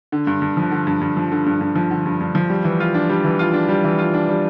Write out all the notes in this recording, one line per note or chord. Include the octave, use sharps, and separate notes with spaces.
D3
G2
G2
F3
D3
G2
G2
F3
D3
G2
G2
F3
D3
G2
G2
F3
G3
E3
F4
D4
G3
E3
F4
D4
G3
E3
F4
D4
G3